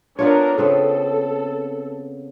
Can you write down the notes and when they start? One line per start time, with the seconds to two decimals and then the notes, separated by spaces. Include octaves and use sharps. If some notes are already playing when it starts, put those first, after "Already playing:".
0.19 B3 D4 F4 A#4 C#5
0.58 C#3 B3 C4 A4